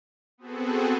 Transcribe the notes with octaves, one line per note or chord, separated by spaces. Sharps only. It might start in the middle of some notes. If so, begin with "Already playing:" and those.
B3 C4 F#4 G#4 A4